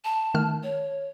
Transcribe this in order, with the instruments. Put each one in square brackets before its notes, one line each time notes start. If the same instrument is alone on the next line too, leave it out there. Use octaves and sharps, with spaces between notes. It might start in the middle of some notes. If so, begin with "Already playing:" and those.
[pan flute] A5
[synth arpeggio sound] D#3 A3 F6
[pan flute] C#5